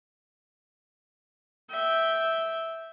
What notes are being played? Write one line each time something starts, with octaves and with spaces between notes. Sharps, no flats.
E5 G5